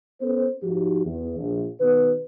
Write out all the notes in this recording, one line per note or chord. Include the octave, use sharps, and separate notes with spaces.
B3 C#4 A4 C5
G#2 F3 D#4 F#4 G4
E2
A#1
B2 D#3 B3 B4